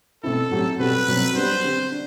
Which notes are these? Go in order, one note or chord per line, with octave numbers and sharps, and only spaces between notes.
B2 A3 C4 E4 A4
A2 F#3 A3 C4 G4
B2 G3 C4 F#4 A4 B4
B2 F#3 C4
G3 B3 D4 C5
D3 G3 C4
D4